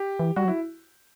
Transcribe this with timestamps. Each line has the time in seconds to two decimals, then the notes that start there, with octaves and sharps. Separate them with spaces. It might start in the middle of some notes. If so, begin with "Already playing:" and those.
Already playing: G4
0.19 E3
0.36 G3 F#4
0.45 F#3
0.48 E4